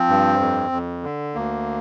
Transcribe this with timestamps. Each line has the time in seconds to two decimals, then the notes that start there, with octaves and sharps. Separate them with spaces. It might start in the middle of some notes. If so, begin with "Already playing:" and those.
Already playing: F3 C4
0.09 G2
0.40 F2
0.72 F2
1.04 D3
1.35 D2 A#3